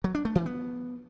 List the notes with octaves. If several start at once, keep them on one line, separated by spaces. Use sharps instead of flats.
F#3
D4
A3
E3
B3